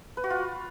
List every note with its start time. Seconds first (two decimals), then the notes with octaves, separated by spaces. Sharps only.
0.17 B4
0.24 F#4
0.30 F4